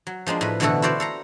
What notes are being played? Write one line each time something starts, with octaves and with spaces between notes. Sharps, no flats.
F#3
F3 G#3 A#3 D4
A2 B4
B2 D3 E3 A3 F#4 A4
E4 F#4 C5 D5 F5
A4 F5 A#5